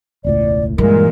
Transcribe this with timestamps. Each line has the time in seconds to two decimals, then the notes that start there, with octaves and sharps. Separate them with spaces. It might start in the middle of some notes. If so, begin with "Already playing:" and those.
0.24 E1 C#2 A2 D5
0.78 G2 A#2 E3 G#3 A#4